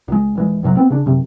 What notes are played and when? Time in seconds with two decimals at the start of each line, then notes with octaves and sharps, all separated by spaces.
0.08 C#2 G#3
0.35 D#1 E3 G#3
0.63 B1 F#2 C3 F#3
0.77 B3 C4
0.90 C#3 D4
1.06 F#2 C3